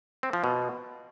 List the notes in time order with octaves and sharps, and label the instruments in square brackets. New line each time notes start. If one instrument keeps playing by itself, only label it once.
[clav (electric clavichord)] C4
F3
B2